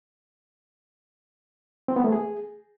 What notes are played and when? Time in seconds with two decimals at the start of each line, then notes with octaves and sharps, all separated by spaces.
1.88 C4
1.96 B3
2.04 A3
2.12 G#4